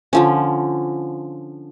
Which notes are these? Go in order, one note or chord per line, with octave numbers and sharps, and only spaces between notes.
D3 F3 C#4